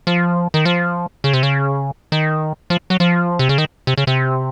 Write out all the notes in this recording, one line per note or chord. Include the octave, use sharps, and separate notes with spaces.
F3
D#3
F3
C#3
C3
C#3
D#3
F3
F#3
F3
C3
C#3
D#3
C3
C#3
C3